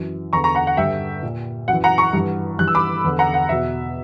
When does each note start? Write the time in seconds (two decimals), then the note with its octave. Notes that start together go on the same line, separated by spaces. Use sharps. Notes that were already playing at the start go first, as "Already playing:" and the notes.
Already playing: F#2 E3
0.33 E2 D3 A#5 C#6
0.44 A#5 C#6
0.55 F#5 A#5
0.67 F#5
0.77 G2 D3 E5 G5
1.23 A#2
1.68 F#2 E3 F#5
1.84 F#5 A#5
1.98 A#5 C#6
2.13 G2 E3
2.58 G2 E3 F#6
2.68 E6
2.75 B5 D6
3.04 E2 D3
3.19 F#5 A#5
3.34 F#5
3.49 E2 B2 E5